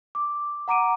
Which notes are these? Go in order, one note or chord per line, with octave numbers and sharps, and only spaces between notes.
D6
F#5 A#5 D6 D7 D#7